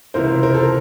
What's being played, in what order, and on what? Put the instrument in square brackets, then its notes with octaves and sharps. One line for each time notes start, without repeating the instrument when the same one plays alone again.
[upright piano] C#2 C3 E3 A#4 C5
A#4 C5
A4
A#4